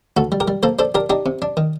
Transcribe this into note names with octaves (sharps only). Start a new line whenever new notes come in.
D2 F#4 A4
G3
G4 A#4
G3
A#3 A4 C5
D4 A4 C5
D4 G4 A#4
D4 D#4 G4
C3
D4
D#3